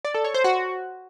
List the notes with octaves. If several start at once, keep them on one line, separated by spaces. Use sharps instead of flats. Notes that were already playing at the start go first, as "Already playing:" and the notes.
D5
A4
C#5
C5
F#4